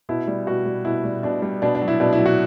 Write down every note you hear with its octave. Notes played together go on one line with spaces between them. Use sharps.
B2 E4
G3
B2 F#4
G3
B2 E4
G3
B2 D4
G3
B2 D4
D4
F#3
E4
B2 D4
E4
F#3
F#4